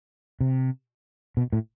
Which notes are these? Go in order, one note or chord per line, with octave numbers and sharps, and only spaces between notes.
C3
B2
A2